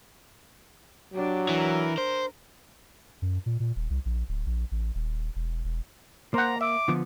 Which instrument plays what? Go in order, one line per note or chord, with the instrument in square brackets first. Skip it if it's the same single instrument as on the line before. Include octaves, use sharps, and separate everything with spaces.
[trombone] F#3 [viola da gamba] D4 G4
[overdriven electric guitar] E3 [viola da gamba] A#4
[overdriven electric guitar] C5
[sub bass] F#2
A#2
A#2
D#1
C2
A#1
D1
A#1
A1
D#1
E1
E1
[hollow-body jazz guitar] A#3 [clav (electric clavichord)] C5 F#5 [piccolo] A#5
[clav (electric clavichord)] E5 [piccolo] D6
[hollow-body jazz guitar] D3 F3 B3